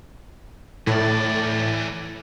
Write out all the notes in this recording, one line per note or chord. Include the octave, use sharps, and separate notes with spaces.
A2 E3 D5